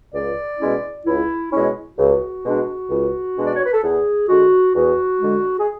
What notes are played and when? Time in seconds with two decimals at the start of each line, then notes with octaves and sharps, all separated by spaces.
0.13 C#2 D5
0.59 B2 G#3 C#4 E4
1.05 C#2 E4
1.51 B2 G#3 C#4 E4
1.97 C#2 F#4
2.43 B2 G#3 D4
2.90 C#2
3.36 B2 G#3 D4
3.44 D5
3.54 C#5
3.64 B4
3.73 A4
3.82 E2 G#4
4.28 D3 G#3 F#4
4.74 E2 F#4
5.20 D3 G#3
5.58 G#4